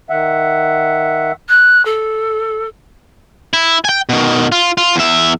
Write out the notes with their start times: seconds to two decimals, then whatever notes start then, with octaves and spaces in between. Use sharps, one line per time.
0.10 D#3 E5 F#5
1.48 F#6
1.85 A4
3.53 E4
3.85 G5 G#5
4.09 B2 D#3
4.52 F4
4.78 F4
4.96 E2 E5